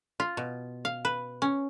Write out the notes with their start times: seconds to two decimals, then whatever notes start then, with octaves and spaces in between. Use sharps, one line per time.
0.20 F4
0.37 B2
0.85 F5
1.05 B4
1.42 C#4